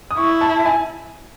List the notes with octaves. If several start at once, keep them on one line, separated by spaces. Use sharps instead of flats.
D#6
E4 C#6
A5
G#5